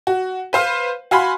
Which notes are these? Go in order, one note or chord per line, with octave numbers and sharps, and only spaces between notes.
F#4
B4 C5 F5
F#4 F5 G#5 B5 C6